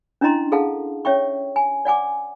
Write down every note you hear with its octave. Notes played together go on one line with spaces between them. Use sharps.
C#4 D4 E4 D#5 A#5 C6
G#4 A4 F5 F#5 A5
C#4 C#5 E5 G5 C#6
G#5
D5 F#5 G#5 D6